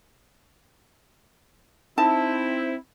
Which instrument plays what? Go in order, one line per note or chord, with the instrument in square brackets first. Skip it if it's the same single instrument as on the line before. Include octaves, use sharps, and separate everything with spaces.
[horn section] C4 E4 [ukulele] D#4 A5